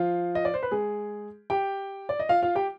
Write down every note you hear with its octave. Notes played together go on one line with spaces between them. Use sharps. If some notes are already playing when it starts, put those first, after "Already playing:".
Already playing: F3 F4
D#5
D5
C5
B4
G#3 G#4
G4 G5
D5
D#5
F4 F5
F4 F5
G4 G5